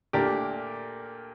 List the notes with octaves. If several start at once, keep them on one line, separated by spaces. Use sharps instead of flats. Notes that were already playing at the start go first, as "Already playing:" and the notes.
A#2 A3 D4 G4 A#4